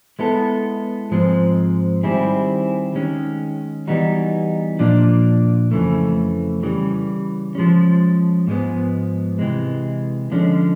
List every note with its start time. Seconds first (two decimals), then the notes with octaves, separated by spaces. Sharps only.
0.19 G#3 B3 E4 A4
1.11 G#2 F3 G#3 C4
2.03 D#3 G3 C4 E4 G#4
2.95 D#3 G#3 C#4
3.87 E3 G3 B3 D#4 F#4
4.79 A#2 F3 A#3 D4 F4
5.71 F2 C#3 E3 A3
6.63 C#3 E3 G3
7.55 F3 G#3 C#4
8.47 G#2 F3 G#3 B3
9.39 C3 E3 G#3
10.31 D3 F3 G#3 C#4